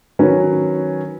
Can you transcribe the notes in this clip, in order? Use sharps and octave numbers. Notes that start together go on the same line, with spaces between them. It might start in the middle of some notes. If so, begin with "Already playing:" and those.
D#3 F#3 C#4 B4